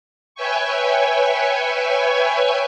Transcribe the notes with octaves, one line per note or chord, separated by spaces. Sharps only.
B4 C#5 E5 G5 G#5 C#6